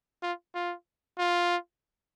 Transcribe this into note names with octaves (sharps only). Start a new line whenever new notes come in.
F4
F4
F4